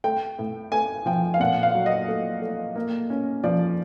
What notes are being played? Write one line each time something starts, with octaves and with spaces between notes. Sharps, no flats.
A3 G5
A2
A3 G#5
F3 G5
F5
A#2 F#5
F5
F#3
D#5
A3
A3
A#3
C#4
F3 D5